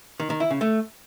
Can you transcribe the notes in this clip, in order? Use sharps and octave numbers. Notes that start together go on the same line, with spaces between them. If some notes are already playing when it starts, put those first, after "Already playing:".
D#3
D#3
E4
C#3
A3